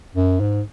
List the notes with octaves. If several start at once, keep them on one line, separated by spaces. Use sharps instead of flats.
F#2
G#2